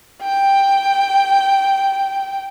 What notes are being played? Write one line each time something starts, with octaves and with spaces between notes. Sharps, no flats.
G5